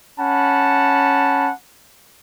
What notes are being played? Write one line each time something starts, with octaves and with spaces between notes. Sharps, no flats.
C#4 F#5 A5 B5